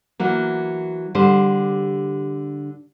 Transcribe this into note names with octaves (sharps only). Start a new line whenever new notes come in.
E3 F#3 A#3
D3 G3 G4 C5